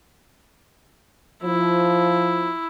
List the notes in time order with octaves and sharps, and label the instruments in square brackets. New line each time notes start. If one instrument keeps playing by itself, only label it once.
[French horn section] F3 [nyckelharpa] E4